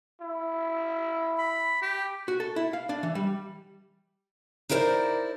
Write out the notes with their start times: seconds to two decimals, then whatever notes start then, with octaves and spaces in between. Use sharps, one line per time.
0.21 E4
1.38 B5
1.82 G4
2.28 F#4
2.40 A4
2.56 E4
2.73 F5
2.89 D4
3.03 E3
3.15 G3
4.69 D#4 E4 A#4 C5 D5